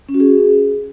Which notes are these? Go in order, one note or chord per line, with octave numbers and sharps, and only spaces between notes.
C#4
F#4
G#4